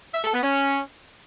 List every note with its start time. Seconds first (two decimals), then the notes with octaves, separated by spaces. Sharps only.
0.14 E5
0.24 A4
0.33 B3
0.43 C#4